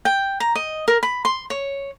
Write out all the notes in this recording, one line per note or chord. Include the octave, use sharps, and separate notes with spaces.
G5
A#5
D#5
A#4
B5
C6
C#5